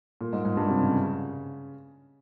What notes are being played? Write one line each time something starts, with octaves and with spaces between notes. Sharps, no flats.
A#2
G#2
G#2
G2
C3
C#3